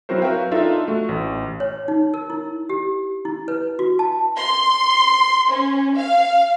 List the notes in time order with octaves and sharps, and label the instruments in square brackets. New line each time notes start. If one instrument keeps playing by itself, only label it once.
[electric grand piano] F#3 C4 E4 F#4 A#4 C5
F#4 A#4 B4 E5 F5 G5
D4 D#4 F4 A4 E5
A3 F#4
A1
[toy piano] C#5
D#4
A#4
E4
G4
E4
B4
F#4
A5
[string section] C6
C#4
F5